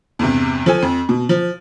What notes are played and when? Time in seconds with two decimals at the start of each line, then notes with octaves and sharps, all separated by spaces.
0.19 E2 G2 C3
0.66 F3 A4 G#5
0.83 F2
1.09 B2
1.29 F3